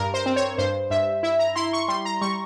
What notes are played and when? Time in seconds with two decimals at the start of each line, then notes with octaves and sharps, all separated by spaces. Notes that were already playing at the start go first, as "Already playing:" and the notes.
Already playing: G2 A#4
0.14 C5
0.26 C4
0.36 C#5
0.58 G2 C5
0.91 G2 E5
1.23 E4 E5
1.39 A#5
1.56 E4 C6
1.73 C#6
1.88 G3 C6
2.05 A#5
2.22 G3 C#6